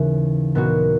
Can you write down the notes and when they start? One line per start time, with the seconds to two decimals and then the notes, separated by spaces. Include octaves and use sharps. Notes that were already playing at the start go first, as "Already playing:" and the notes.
Already playing: D#2 C#3 E3
0.55 A#2 F#3 B3 D#4 F#4